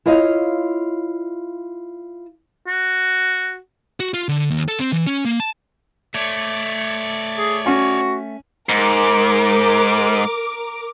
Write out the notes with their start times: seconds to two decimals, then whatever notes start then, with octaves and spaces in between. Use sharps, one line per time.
0.06 E4 F4 C#5 D#5 F5
2.68 F#4
4.00 F#4
4.14 F4
4.29 D3
4.51 D#2
4.68 A4
4.80 C4
4.92 E3
5.07 C#4
5.25 A#3
5.40 A5
6.15 A3 C#5 D5
7.38 G#4
7.66 C#4 F#4
8.69 G#2 A#4 D6